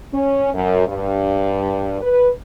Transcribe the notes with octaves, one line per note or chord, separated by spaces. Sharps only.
C#4
F#2
G2
B4